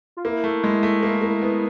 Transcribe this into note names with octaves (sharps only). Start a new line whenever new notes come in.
F4
A#3 E4
A3
G#3
A3
A#3
A#3
B3